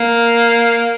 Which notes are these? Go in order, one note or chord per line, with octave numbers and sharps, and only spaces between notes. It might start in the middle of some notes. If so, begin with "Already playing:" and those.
Already playing: A#3